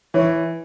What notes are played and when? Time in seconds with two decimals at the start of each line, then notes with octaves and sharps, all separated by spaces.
0.14 E3 C#5